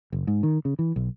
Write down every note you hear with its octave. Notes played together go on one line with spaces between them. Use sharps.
F#1
G#2
D#3
C#3
E3
B1